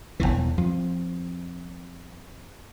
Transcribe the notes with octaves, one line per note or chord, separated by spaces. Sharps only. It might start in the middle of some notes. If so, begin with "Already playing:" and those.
E1 A#1 E2 E3
F2 F3